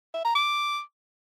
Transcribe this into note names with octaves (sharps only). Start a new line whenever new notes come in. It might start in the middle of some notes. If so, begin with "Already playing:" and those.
E5
A#5
D6